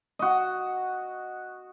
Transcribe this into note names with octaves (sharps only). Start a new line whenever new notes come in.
F#4 D#5